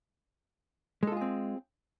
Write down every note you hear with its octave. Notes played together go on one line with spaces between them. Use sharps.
G#3 C4 F4 G#4 A4